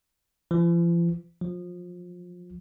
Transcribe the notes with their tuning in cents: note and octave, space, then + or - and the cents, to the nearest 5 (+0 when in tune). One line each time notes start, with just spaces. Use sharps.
F3 -45
F3 +25